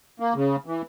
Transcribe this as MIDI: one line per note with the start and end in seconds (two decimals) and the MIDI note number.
0.20 0.34 58
0.35 0.56 49
0.66 0.82 52